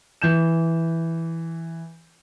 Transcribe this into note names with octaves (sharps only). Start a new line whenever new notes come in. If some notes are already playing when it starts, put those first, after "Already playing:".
E3 G6 E7